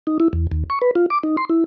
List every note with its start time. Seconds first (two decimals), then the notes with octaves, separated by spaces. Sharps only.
0.07 D#4
0.20 E4
0.33 E2
0.52 D#2
0.70 C#6
0.82 B4
0.95 F4
1.10 D6
1.23 D#4
1.37 C6
1.50 E4